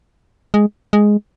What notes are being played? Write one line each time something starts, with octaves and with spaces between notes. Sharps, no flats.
G#3
G#3